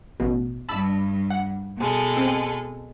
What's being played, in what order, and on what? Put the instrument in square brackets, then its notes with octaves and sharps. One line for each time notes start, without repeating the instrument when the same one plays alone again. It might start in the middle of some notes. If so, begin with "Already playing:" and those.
[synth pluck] A1 B2
[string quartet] G2 [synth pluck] A5 B5 E6
[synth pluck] F#5
[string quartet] B2 G#3 A4
[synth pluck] C4